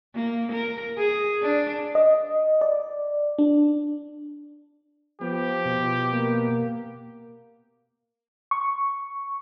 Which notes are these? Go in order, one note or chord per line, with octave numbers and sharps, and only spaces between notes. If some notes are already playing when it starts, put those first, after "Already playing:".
A#3
A#4
G#4
D4
D#5
D5
D4
F3 B3 G4
B2
A#3
C#6